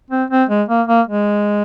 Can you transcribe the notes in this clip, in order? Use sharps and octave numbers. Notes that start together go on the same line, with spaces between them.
C4
C4
G#3
A#3
A#3
G#3